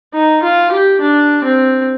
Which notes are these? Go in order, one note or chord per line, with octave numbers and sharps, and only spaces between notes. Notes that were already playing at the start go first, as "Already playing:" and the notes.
D#4
F4
G4
D4
C4